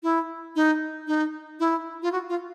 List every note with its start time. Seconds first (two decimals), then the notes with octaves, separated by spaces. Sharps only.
0.03 E4
0.56 D#4
1.07 D#4
1.59 E4
2.02 F4
2.12 F#4
2.29 F4